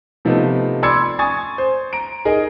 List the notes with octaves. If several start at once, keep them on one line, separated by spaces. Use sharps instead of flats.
C3 F3 A3 B3 D#4
D5 B5 C6 E6 G#6 C#7
G#5 C#6 D#6 G#6 A6
C5
A#5 D7
D#4 G#4 A#4 D#5